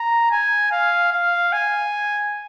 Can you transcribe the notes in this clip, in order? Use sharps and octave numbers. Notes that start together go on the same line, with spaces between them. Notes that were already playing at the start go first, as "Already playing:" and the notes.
Already playing: A#5
G#5
F5
F5
G#5